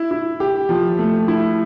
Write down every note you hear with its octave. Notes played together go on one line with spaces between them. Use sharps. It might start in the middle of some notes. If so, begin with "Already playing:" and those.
Already playing: E4
E4
G4
F3
A3
E4